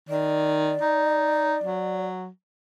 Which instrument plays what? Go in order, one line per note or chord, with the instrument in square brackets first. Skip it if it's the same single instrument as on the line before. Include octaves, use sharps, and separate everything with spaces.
[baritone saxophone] D#3 [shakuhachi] D5
[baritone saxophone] D#4
F#3